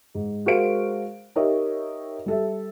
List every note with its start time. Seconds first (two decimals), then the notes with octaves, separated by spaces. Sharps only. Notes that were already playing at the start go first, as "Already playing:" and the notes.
0.15 G#2
0.46 G#3 F#4 A#4 C5 F5 D7
1.36 D#4 G4 A#4 C#5 D#5 E5
2.26 G3 A4 E5